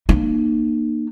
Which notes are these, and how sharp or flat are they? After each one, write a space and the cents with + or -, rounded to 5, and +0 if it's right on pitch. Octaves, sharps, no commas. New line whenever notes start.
A#3 +5 D#4 -40